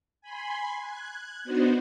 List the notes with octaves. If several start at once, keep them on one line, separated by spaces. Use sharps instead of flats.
G#5 B5 C6
F#6 G#6
B3 D4 D#4 F#4 C5